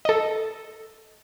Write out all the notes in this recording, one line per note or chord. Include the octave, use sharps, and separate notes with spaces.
A4 D#5